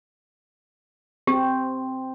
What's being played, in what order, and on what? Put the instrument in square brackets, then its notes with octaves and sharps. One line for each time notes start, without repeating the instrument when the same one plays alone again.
[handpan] C4 [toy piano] G4